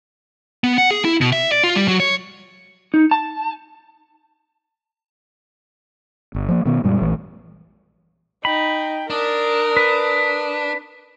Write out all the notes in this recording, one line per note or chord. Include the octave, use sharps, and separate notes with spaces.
B3
F#5
G#4
E4
B2
E5
D5
F4
G3
F#3
C#5
D#4
A5
G1
F3 A#3
B2 D#3 B3
F#2 A#2 G3 G#3
A#1 E3 A3
D#4 G5 B5
D4 A#4 D#6
B4